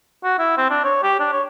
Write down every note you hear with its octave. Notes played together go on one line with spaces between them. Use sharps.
F#4
E4
C4
D4
C#5
G4
D4
C#5